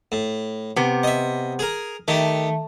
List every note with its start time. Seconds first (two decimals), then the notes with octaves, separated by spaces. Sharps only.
0.12 A2
0.76 C3 B3
1.03 D#5 E5
1.59 G#4 A#4
2.08 D#3 A3 G4